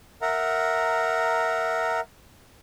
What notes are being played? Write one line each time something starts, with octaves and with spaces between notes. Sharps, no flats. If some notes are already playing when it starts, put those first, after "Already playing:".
A#4 E5 F#5 A#5